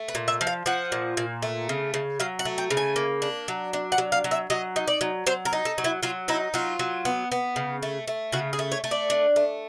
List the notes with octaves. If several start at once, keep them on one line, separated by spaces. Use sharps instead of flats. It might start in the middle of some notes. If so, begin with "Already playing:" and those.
Already playing: A3
B4
A#2
E5
F3
F5
F3 F#5
A#2
A#2
A3
C#3
C#3
F#3 F5
F#5
A3
G5
C#3
G#5
A#3
D4
F#3
D4
F#5
F#3
F5
F#3
E5
F#3 D#5
D#4
D5
F#3
F#3 C5
A#4
D#4
A4
F#3
E4
F#3 F4
D#4 E4
F#3 F4
F#3
B3
B3
C#3
A3
A3
C#3 F#4
G#4
A3
C#5
A3
D5
D4
A3